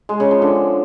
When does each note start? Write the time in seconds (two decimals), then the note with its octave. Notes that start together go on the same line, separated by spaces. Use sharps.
0.09 G#3
0.20 C#3
0.31 F3
0.42 D3